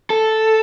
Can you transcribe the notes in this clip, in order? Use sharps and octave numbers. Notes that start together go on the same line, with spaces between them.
A4